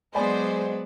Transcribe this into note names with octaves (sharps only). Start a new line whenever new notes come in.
F#3 G#3 B3 D4 C5 D5 G#5 B5